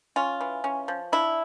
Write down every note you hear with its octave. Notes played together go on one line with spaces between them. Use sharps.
C#4 F4
E3
C#4
F3
D4 E4